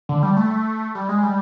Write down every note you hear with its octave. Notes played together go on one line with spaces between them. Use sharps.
D3
G3
A3
G3
G#3
G3